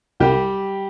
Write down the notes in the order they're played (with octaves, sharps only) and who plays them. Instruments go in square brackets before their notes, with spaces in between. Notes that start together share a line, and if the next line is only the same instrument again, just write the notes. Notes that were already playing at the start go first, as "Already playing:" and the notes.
[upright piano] C2 [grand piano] G3 G4